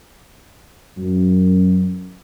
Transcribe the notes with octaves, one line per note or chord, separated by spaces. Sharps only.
F#2